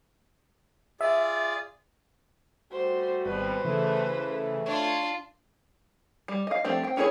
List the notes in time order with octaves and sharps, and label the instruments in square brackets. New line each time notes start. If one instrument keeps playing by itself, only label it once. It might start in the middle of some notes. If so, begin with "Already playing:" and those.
[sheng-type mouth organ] F4 G#4 D5 [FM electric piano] E5
[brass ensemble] G3 A3 F#4 [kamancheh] C5
[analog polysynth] G#1 [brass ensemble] B2 G3 [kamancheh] B4 C5
[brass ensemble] D2 A3 [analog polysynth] C#3 E3
[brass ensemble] A3
[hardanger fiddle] D4 F4 [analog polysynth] C#5
[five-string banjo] G3
D#5 F5
F3 A3 C4 D4 G4
C4 G5
C#4 E4 G#4 C5 C#5